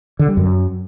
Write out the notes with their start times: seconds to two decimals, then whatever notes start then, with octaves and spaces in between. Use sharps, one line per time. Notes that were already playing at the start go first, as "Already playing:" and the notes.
0.19 D3
0.28 G3
0.37 F#2